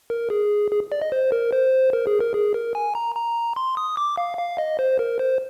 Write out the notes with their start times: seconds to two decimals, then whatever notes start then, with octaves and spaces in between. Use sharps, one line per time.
0.10 A#4
0.30 G#4
0.71 G#4
0.92 D5
1.02 D#5
1.12 C5
1.32 A#4
1.53 C5
1.93 A#4
2.07 G#4
2.21 A#4
2.34 G#4
2.54 A#4
2.75 G#5
2.95 A#5
3.16 A#5
3.56 C6
3.77 D#6
3.97 D6
4.17 F5
4.38 F5
4.58 D#5
4.79 C5
4.99 A#4
5.19 C5